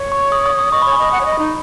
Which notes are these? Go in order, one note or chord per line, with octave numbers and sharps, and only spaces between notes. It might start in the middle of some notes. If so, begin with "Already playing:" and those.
Already playing: C#5
C#6
D#6
D#6
D#6
D#5 C#6
B5
C#5
G#5
D#5 D#6
F#5 C#6
C#5
D#5
B5
D#4